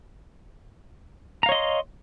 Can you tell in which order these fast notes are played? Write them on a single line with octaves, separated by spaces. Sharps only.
A#5 F5 C#5 D#5 C6